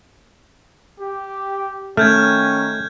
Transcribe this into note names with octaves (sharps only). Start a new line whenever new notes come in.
G4
D#3 A3 C#4 F6 G6 G#6